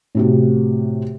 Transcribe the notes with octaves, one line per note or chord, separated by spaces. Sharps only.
A2 C3 F#4